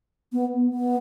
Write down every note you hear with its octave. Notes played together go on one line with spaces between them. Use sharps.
B3
B3